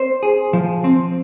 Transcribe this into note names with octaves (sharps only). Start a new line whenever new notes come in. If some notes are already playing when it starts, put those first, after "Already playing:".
Already playing: C4 C5
G#4
F3
C4